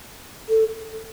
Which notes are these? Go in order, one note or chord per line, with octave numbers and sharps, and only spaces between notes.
A4